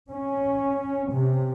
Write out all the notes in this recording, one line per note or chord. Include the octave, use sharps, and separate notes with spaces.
C#4
C3